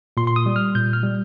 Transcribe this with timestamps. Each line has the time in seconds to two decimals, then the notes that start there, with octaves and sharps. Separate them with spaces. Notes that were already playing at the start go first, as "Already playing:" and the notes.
0.17 A#2 C6
0.27 C6
0.36 D#6
0.46 G3
0.56 F6
0.75 A#2 G6
0.93 F6
1.03 G3